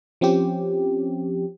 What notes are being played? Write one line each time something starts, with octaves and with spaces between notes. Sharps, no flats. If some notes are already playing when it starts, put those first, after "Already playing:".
F3 C4 C#4 G4